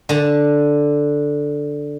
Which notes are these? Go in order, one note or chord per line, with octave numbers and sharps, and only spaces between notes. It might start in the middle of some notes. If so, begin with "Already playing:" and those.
D3 A5